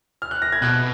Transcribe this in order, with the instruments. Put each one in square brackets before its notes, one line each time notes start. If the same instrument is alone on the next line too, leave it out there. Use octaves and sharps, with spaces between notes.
[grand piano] F6
F#6
A#6
G#6
[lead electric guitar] B2 [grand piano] F#6